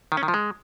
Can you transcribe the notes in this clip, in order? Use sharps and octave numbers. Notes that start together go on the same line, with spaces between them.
D#3
C#4
D#3
F3
G#3